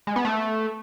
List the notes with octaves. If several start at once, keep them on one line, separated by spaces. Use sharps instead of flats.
G#3
B3
A3